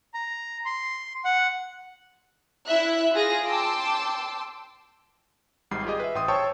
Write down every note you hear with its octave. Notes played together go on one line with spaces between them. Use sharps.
A#5
C6
F#5
E4 E5 F#6
F4 G#4 A#6
G5 A5 C6 D6 E6
G#1 G#2 G3 B5 C7
F4 G4 G#4 D#5
B4 E5
A1 G5 C6 D#6
C5 C#5 G5 A5 C#6 E6